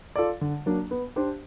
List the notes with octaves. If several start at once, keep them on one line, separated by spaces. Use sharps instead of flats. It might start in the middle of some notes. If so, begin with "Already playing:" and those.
F4 A4 D5
D3
F#3 A#3 D4
B3
D4 G4 C5